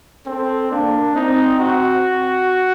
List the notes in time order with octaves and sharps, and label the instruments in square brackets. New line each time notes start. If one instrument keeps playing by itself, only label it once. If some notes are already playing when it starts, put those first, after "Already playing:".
[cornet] C4 [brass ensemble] A4
[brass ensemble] A#3 [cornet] D4
[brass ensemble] C4 [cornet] D#4
[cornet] F#4